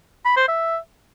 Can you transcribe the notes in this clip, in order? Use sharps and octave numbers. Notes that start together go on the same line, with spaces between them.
B5
C5
E5